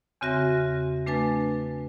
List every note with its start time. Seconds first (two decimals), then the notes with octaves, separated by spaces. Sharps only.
0.21 E2 C#3 C4 F#4 E5 A#6
1.06 A3 D4 B4 G#5 A6